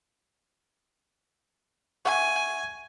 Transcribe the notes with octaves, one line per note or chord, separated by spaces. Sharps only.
E5 F#5 G#5 C#6